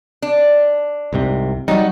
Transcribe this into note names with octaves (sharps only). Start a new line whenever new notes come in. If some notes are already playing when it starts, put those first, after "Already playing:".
D4
C2 G#2 C3
F#3 G3 D#4 F#4